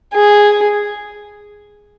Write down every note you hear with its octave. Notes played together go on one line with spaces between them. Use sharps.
G#4